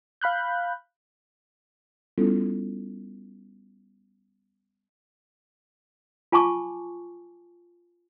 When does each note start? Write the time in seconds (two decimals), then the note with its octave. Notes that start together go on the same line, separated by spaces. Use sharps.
0.21 F5 B5 F#6 G6
2.18 G3 B3 C#4 E4 F4 A4
6.32 F4 G#5 A5 C#6 D6